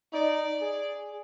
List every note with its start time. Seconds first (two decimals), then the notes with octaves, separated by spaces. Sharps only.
0.13 D#4 D5
0.61 G#4